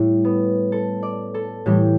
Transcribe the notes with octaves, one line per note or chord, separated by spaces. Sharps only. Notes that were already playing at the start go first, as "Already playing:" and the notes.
Already playing: A2 G3 E4
B3
A4
D5
A4
A2 E3 G3 G4